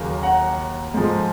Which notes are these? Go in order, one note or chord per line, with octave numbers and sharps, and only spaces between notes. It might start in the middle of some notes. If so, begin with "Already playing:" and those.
Already playing: D#2 C#3 F#3 A#3 F5
F#5 A#5
G#2 F3 G#3